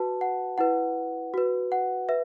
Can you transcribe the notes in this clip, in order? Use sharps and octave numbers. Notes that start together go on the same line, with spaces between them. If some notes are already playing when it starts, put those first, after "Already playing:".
Already playing: F#4 B4 A5
F#5
E4 B4 F#5
F#4 B4
F#5
B4 E5